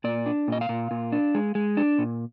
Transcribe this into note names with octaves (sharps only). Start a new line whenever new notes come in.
A#2 D5
D4
A#2 D#5
F5
A#2
A#2
D4
G#3
G#3
D4
A#2